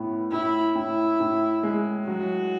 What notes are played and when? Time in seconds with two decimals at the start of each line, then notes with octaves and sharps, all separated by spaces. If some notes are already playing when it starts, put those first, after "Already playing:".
Already playing: A2 B3
0.32 A2 E4
0.75 A2 E4
1.20 A2
1.63 G#3
2.08 F#3 F#4